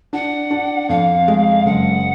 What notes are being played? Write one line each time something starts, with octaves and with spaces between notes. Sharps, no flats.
D4 F#5
D4
F2 F5
G#3
F#1 F#5